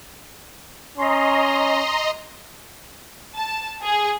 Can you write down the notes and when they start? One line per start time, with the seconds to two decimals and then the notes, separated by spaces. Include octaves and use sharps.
0.98 C#4 D#5 A#5 C6
3.36 A5
3.82 G#4